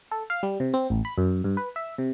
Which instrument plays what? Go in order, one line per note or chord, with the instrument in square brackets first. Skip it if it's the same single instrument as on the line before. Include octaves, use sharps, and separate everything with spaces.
[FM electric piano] A4
F5
G3
C3
C4
A1
B5
F#2
G2
B4
E5
C3